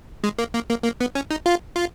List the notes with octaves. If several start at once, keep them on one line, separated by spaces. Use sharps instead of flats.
G#3
A#3
A#3
A#3
A#3
B3
C#4
D#4
F4
F4